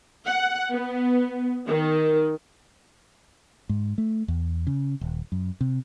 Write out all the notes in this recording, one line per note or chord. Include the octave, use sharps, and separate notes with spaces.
F#5
B3
D#3
G#2
A3
E2
C#3
D#1
F#2
C3